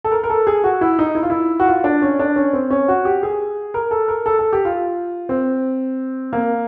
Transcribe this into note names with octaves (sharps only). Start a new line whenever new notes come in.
A4
A#4
A#4
A4
G#4
F#4
E4
D#4
E4
F4
E4
F#4
F4
D4
C#4
D4
C#4
C4
C#4
F#4
G4
G#4
A#4
A4
A#4
A4
A4
G4
F4
C4
A#3